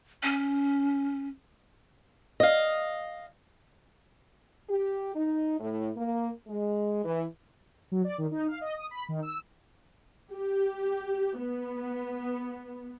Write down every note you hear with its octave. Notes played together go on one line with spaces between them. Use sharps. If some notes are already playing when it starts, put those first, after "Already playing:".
C#4
D#5 F5
G4
D#4
A2
A#3
G#3
E3
F#3
D5
D#3
D#4
F5
D#5
D#6
B5
D#3
E6
G4
B3